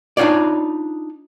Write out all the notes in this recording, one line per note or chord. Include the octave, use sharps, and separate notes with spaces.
D4 D#4 F4 C#5 D5